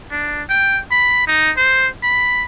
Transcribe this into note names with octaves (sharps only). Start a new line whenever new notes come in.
D4
G5
B5
D#4
C5
B5